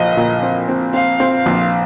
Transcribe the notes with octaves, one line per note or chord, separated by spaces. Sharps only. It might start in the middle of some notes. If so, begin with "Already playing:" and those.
Already playing: A#1 F3 D#5
A#2
C4
C4
C4 F5
C4
F5
A#1